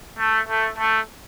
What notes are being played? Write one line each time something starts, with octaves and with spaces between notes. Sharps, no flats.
A3
A3
A3